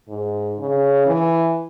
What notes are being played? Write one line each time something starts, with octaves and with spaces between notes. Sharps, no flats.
G#2
C#3
E3